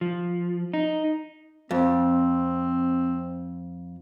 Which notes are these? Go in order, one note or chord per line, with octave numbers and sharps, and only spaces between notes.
F3
D#4
F2 C4